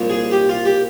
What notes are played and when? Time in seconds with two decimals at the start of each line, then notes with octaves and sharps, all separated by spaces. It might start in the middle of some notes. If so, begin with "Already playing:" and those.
Already playing: C2 A#2 F3 A#3 C#4
0.10 G#4
0.31 G4
0.49 F4
0.65 G4